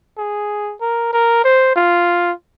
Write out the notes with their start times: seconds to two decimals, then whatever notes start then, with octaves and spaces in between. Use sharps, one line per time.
0.18 G#4
0.81 A#4
1.13 A#4
1.44 C5
1.76 F4